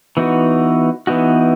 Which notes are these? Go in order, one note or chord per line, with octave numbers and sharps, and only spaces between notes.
E3 B3 D#4 F#4
E3 B3 D#4 F#4